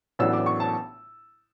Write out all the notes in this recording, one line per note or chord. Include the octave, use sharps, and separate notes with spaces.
A1 A2 F#3 B3 D4 E6
D6
C#6
A5